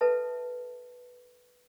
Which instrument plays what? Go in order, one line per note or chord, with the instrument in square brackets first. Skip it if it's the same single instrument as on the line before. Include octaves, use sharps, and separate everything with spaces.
[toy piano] A4 B4 E5 A5